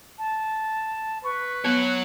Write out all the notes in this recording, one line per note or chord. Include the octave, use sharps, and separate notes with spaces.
A5
B4 C#6
F#3 B3 C#5 F#6